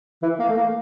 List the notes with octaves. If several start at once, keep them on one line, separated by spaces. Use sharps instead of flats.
E3
A#3
A3
A#3